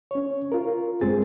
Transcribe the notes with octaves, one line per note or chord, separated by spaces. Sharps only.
C#4 C#5
F4 A#4
G2 G#3 C4 G#4 A6